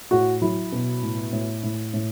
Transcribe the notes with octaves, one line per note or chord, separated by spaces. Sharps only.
A2 F#4
F#3 E4
B2
A2
A2
A2
A2